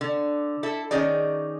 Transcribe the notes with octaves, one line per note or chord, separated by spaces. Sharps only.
D3
E4 A4
D#3 C#4 D#4 G#4 D5